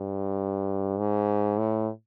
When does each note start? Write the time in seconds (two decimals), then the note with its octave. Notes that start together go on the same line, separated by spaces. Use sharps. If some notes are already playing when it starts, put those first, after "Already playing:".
Already playing: G2
0.98 G#2
1.58 A2